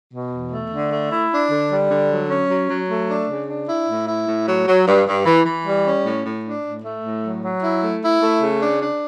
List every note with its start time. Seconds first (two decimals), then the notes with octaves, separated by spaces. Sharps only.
0.12 B2
0.32 E2
0.51 A3
0.71 D3
0.91 A3
1.11 E4
1.30 D4
1.50 D3
1.70 G3
1.89 D3
2.09 F#3
2.29 C#4
2.49 F#3
2.69 F#3
2.88 A3
3.08 D4
3.28 C#3
3.48 D4
3.67 E4
3.87 A2
4.07 E4
4.27 A2
4.46 F#3
4.66 F#3
4.86 G2
5.06 G2
5.26 E3
5.45 E3
5.65 G3
5.85 C#4
6.04 A2
6.24 A2
6.44 D4
6.64 A2
6.83 A3
7.03 A2
7.23 F#3
7.43 F#3
7.62 E4
7.82 A3
8.01 E4
8.21 A3
8.41 C#3
8.61 D4
8.81 D4